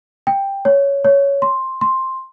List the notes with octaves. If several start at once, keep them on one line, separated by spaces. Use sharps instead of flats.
G5
C#5
C#5
C6
C6